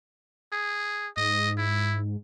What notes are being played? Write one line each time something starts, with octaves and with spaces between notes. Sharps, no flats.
G#4
G#2 D#5
E4